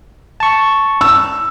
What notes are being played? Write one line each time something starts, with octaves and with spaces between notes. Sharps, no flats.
A5 C#6
E6